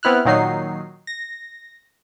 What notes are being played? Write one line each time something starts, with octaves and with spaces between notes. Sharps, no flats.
B3 C4 E4 F6 F#6
A#2 D#3 F#3 D#4 C7
A#6